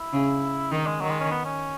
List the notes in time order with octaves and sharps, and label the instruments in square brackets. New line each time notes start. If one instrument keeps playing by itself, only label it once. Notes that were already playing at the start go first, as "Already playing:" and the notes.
Already playing: [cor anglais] E4
[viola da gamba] C#3
[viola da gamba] D#3 [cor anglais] D#4
[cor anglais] G#3
[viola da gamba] D#3 [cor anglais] F#3
[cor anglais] G#3
C#4
B3
C#4